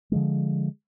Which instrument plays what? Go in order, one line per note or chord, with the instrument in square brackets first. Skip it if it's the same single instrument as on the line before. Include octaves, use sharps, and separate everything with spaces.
[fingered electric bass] D3 F3 G#3